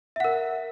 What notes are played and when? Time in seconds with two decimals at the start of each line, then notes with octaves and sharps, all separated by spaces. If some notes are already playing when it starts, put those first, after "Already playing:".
0.16 E5
0.20 F#5
0.24 A#4